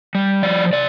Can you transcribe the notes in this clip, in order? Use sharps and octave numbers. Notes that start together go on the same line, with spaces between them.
G3
F3 D5
C3 D5